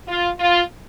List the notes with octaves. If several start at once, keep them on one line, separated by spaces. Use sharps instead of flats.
F4
F4